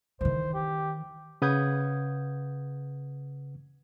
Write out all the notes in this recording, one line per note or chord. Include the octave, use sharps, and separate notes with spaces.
D#3 E3 C5
G4
C#3 B4 F#5 D#6 G6 G#6